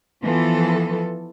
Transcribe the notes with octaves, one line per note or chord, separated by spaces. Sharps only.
E3 F3 B3 A4